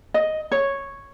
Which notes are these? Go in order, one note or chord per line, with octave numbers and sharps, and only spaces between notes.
D#5
C#5